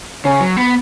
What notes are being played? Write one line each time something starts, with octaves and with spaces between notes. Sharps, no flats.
C#3 C#4
F#3
B3